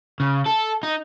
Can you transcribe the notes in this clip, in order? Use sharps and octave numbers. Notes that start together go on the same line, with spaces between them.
C#3
A4
D#4